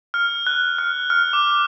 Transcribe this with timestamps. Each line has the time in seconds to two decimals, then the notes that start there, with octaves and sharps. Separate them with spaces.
0.14 F6
0.47 F#6
0.78 F6
1.10 F6
1.33 D6